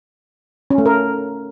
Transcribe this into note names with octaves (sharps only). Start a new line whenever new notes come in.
C#4
A3
A#4